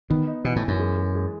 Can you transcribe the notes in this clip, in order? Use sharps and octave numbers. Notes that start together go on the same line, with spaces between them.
D#3 B3
D#4
B2 E3
A2
E3
F#2
G#3
G#3
G#3